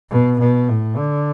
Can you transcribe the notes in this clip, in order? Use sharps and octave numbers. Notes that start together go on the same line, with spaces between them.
B2
B2
A2
D3